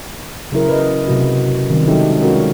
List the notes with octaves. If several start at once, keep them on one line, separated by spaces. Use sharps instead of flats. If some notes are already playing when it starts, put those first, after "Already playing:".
C#3 F#3 E4 A#4
B4 D#5
C3 F#3 A3 F#4
D#3 G3 C4
F#3 G#3 D#4 G4 A4 E5
G#3 C#4 F4 F#4 A#4